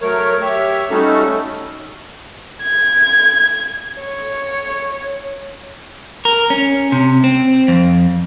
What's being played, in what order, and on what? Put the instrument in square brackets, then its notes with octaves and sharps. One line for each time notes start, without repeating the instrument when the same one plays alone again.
[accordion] F#3 A3 A#4 C#5
G4 C#5 E5
G3 A3 C#4 D#4 F#4 A4
[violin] G#6
C#5
[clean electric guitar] A#4
C#4
C3
C4
F2